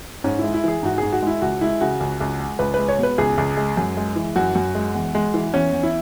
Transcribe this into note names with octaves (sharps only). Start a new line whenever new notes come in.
G#2 C#4
G#3 E4
E4
E3 G#4
G#2 F#4
G#2 G#4
F#4
G#3 E4
C#2 F#4
G#3 E4
C#3 F#4
C#2
C#2
G#3
C#2 B4
G#3 B4
C#5
B2 B4
C#2 G#4
C#2
G#3
F#2
G#3
E3
F#2 F#4
F#2
G#3
E2
G#3
E3
E2 C#4
E2
E4